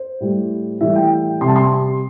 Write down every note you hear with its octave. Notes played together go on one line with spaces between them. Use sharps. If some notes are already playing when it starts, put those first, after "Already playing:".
Already playing: C5
A2 G3
A2 E3 G3 E5
G5
C3 G3 A5 C6
C6